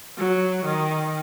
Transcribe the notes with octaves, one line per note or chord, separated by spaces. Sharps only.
F#3
D#3